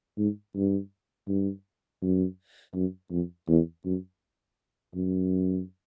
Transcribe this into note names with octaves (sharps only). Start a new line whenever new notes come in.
G#2
G2
G2
F#2
F#2
F2
E2
F#2
F#2